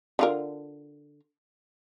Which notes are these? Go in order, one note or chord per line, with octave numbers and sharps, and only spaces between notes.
D3 F4 A#4